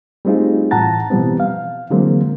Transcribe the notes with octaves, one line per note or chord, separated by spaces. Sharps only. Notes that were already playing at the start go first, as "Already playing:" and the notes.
G3 A3 C4 D#4 F4 G#4
A2 E3 F#5 A5 A#5 A6
B2 E3 F3 G3 B3 C4
F5
D3 E3 F#3 G#3 A#3 C4